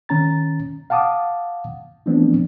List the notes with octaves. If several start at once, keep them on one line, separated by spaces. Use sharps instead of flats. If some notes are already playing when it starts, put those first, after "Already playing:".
D#3 C#4 A#5 A6
F5 F#5 A5 D6 D#6
E3 F3 A3 B3 C4 D4